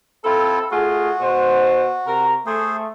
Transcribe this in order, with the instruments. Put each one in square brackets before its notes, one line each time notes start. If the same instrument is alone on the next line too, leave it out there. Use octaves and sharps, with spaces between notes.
[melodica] C4 E4 F4 [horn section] A4
[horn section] A3 F4 G#4 [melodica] F#4
[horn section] B2 C5
C3 A#4 A#5
[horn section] A3 [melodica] G#4 C5